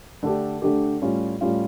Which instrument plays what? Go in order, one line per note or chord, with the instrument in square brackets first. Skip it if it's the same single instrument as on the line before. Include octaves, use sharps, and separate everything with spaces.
[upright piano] D3 A3 D4 G4
D3 A3 D4 G4
A2 G3 C#4 F4
A2 G3 C#4 F4